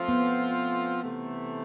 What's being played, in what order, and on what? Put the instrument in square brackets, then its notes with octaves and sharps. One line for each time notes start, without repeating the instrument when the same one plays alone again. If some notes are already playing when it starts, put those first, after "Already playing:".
Already playing: [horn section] F3 A3 C4 F4
[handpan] B3
[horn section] C3 E3 A3